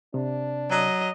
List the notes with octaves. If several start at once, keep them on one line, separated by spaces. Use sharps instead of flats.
C3 D4
F#3 D#5